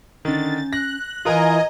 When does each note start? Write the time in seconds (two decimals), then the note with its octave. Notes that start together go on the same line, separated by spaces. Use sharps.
0.25 D3 D#3 C#4 A6
0.73 F#6 A#6
1.25 E3 F4 A#4 B4 D#5 G#5 A#5